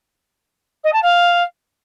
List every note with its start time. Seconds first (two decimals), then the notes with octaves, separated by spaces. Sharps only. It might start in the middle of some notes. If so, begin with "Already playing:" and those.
0.84 D#5
0.93 A5
1.02 F5